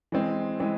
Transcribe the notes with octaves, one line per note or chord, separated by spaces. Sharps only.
E3 G#3 C4
E3 G#3 C4